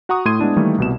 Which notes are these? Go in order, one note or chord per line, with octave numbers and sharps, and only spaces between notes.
F#4 F#5 A#5 C#6 D#6
A2 A3 C6 G#6 D#7
G#3 B3 D4 E4
D#3 E3 G3 A3 A#3
C2 B2 E7